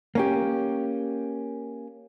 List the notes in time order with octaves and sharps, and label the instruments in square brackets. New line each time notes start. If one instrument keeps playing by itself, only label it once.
[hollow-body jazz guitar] A#3 C#4 G4